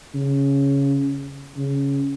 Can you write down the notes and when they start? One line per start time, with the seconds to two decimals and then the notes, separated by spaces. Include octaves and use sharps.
0.14 C#3
1.57 C#3